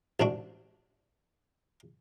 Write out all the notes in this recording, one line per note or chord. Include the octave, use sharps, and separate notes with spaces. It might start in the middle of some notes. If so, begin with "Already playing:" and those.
A1 G#2 D4 F#4